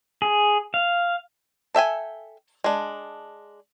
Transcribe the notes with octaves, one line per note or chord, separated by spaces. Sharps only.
G#4
F5
A4 E5 G5 G#5
G#3 D4